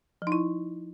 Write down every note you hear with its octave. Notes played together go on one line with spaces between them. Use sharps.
F3
D#4
E4